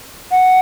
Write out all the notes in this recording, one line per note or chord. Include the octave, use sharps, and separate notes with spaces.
F#5